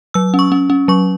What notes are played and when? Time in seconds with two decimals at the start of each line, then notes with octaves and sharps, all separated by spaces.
0.14 F#3 E6
0.34 C#4
0.39 C#6
0.52 C#4
0.70 C#4
0.88 F#3 C#6